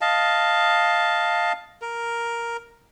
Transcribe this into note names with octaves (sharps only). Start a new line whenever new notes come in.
D#5 F5 A5
A#4